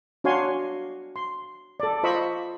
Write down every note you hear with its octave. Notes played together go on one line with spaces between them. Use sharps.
D4 F#4 C#5 F5 G#5 C6
C6
A4 D5
F4 C5 D#5 B5 C#6 E6